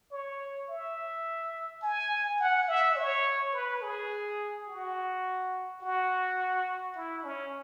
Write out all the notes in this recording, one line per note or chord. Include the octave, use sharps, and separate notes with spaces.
C#5
E5
G#5
F#5
E5
C#5
B4
G#4
F#4
F#4
E4
C#4